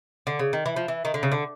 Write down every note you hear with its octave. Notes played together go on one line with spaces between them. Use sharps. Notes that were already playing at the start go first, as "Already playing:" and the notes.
D3
C#3
D#3
E3
F3
E3
D#3
D3
C#3
D3